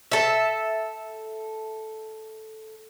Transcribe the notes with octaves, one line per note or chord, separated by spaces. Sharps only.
A4 E5